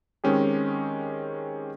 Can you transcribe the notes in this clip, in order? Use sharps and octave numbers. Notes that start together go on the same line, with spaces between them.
D#3 G#3 C4 C#4 G4 G#4